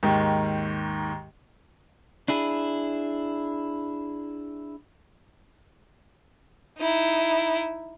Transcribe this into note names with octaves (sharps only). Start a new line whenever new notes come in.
D#2 G#2 D#3
D4 E4 G#4
D#4 E4